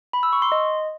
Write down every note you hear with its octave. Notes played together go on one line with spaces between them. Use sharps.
B5
E6
C#6
C6
D#5